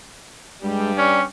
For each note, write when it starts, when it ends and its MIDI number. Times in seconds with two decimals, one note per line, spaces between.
0.63 1.27 43
0.63 1.27 55
0.63 0.92 56
0.63 1.27 67
0.98 1.23 61
0.98 1.19 74